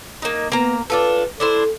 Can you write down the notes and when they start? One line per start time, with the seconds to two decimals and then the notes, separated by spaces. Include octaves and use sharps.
0.22 A#3 D#4
0.52 A#3 B3 A#5
0.90 D4 F4 A4 B4
1.40 D4 E4 A4 C5